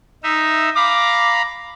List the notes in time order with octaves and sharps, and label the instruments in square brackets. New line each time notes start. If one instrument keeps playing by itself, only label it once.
[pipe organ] D#4 E5
[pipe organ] F5 A#5 B5 [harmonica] D6